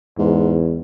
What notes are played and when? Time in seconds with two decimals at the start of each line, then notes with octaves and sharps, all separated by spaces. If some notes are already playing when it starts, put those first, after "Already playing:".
0.19 E2 G#2